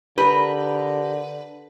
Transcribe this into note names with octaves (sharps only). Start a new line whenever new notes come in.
D3 G4 A#4 B4